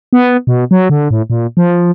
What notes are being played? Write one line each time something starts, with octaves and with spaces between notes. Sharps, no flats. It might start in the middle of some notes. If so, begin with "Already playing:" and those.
B3
B2
F#3
D3
A2
A#2
F3